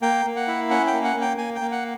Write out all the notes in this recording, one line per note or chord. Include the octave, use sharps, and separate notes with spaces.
A#3 G5
A#3
F#5
E4
C#4 F#5
G5
A#3
F#5
A#3
G5
A#3 G#5
G5
A#3
F#5